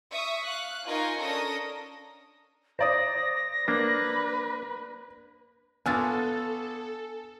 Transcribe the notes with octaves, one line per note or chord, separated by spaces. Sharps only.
E5 C#6 D#6
F5 F#6
D#4 F4 A#4 G#5 C6 C#6
C#4 D4 A4 A#4 D#6 A#6
C5 D5 D#6 A#6
A#3 D4 B4
B3 D4 F4 F#4 A4 G#5 E6 A6